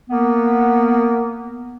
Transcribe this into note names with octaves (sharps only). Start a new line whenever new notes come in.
A#3 B3